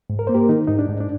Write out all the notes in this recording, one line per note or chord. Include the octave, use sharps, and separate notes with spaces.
G#2
A#4
A#3 C5
G4 A#4
D#3 D#4
G#2 D#4
D4
G#2
D4